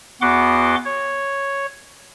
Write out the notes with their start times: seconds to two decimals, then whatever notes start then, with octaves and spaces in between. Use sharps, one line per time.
0.22 E2 B3 F#4 F#5 C6 D6
0.85 C#5